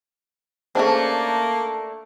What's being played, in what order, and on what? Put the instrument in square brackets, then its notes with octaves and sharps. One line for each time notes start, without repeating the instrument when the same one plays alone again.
[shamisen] C#3 C#4 C5 [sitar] A3 D4 [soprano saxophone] A#3